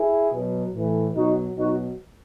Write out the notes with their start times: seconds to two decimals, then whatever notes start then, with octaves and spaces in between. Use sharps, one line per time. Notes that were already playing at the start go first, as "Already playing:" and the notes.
Already playing: E4 G#4
0.32 B2 F#3
0.73 A2 E3
1.14 B2 F#3 D#4 F#4
1.55 B2 F#3 D#4 F#4